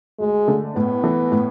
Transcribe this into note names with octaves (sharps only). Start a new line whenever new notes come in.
D2 G#3
D3 A3
A2 B3
E3 A3
A2